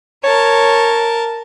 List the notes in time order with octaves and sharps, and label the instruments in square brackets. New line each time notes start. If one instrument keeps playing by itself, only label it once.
[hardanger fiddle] A#4 A5 [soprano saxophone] C#5